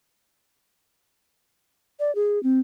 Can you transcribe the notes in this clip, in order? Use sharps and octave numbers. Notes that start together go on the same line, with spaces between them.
D5
G#4
C4